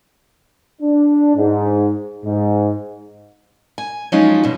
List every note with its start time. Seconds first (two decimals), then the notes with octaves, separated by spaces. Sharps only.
0.81 D4
1.36 G#2
2.25 G#2
3.78 G#5
4.12 F3 F#3 G#3 C#4 D#4 F4
4.43 G2 B2